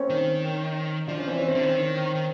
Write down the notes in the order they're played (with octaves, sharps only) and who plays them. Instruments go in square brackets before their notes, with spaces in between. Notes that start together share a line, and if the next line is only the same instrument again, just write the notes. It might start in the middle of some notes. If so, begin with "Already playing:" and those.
Already playing: [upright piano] A#3 C4 C#4 C5 C#5
[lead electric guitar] D#3
[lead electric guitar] F3 [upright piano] D4 D5
[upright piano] C#4 C#5
[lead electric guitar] E3 [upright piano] C4 C5
[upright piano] C#4 C#5
[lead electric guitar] D#3 [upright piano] C4 C5
[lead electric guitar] D3
D#3
D#3